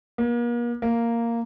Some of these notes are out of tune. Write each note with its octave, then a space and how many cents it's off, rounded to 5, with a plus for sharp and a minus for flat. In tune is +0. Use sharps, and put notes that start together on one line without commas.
A#3 +40
A#3 -5